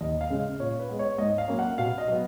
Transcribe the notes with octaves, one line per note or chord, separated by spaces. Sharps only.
D#2 D#5
F5
C#3 G#3 C#4
F5
A#2 C#5
B4
G#3 B3
C#5
G#2 D#5
F5
F#3 A#3 C#4
F#5
B2 F5
D#5
F#3 B3